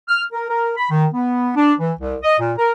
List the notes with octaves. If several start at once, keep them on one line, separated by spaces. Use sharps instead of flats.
F6
A#4
A#4
B5
D#3
B3
D4
E3
C2
D#5
A#2
A#4